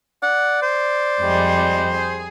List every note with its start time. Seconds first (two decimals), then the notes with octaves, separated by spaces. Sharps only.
0.23 D5 F#5
0.62 C5
1.22 F2 G3 G#3
1.93 G#4